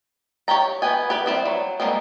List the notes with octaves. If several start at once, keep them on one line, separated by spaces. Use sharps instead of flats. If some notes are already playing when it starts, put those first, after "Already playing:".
G4 C#5 G5 A#5
B3 B4 G5 G#5
G4 B4
G3 C4 E4
F#3
G3 G#3 A#3 C4